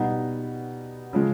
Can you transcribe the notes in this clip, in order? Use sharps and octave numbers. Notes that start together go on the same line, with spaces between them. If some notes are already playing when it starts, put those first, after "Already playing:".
Already playing: B2 G3 B3 D#4
C#3 F3 G#3